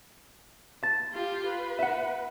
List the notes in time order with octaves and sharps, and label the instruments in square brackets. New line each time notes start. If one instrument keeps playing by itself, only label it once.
[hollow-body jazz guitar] A5
[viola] F4 G4
B4
[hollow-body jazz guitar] E5 F#5